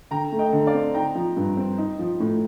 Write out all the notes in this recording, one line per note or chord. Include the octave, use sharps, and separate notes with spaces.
D3 G5 A#5
A3
D#5 G5
D3
D5 F5
C4
D#4 G5 A#5
F3
G2
C4
D#4
F3
A2